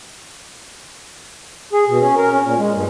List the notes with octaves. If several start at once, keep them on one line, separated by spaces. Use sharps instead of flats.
G#4
B2
C#4
A#4
C#4
A#2
G#3
G2